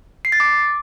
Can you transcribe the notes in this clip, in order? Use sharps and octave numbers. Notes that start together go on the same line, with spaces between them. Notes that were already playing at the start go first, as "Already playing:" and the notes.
C7
A6
D6